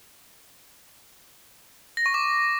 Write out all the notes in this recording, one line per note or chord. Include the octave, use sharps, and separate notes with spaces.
A#6
C#6
D6